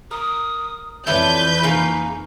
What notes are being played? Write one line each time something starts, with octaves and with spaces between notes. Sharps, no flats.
A#4 D#6
F2 E3 E4 A4 B4 C#5 D5 G6
C#3 A#3 D#4